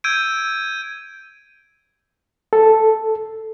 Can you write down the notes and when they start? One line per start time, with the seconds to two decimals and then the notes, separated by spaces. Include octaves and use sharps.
0.04 E6 G6 G#6 D7 D#7
2.53 A4